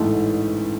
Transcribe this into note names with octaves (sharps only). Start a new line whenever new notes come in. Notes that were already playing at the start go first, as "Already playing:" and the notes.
Already playing: A1 G#2 E3 A3